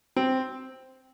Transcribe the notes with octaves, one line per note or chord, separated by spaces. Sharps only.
C4